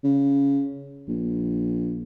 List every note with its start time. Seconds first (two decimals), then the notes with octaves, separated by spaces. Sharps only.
0.04 C#3
1.08 A#1